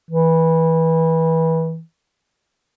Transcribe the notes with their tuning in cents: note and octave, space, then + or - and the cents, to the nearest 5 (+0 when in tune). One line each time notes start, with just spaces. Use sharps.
E3 -20